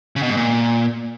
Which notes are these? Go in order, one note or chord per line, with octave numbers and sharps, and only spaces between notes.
C#3
B2
G#2
A#2